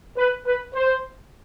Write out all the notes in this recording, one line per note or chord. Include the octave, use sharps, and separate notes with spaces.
B4
B4
C5